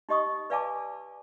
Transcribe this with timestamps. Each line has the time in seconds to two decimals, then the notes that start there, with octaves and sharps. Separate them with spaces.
0.09 D#4 G4 D#5 C#6 D#6
0.50 B4 D5 F5 G#5 A5 D6